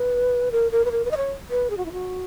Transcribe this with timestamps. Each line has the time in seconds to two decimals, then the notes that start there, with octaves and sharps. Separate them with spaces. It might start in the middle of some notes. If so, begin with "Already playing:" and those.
Already playing: B4
0.52 A#4
0.72 A#4
0.85 B4
0.92 A#4
1.05 B4
1.11 D#5
1.17 C#5
1.50 B4
1.70 G#4
1.77 F#4
1.85 E4
1.92 F#4